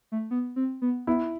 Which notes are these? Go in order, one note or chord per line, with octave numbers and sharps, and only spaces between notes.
A3
B3
C4
B3
B3 E4